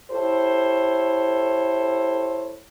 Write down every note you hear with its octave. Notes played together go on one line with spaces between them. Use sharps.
E4 G4 A4 C5 C#5